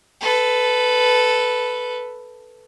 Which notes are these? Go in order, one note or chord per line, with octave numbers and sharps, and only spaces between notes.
A4 B4